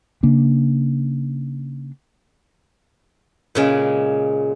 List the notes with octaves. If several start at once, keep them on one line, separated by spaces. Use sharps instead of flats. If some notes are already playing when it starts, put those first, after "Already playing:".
C#3 A#3 D4
A#2 C#3 G#3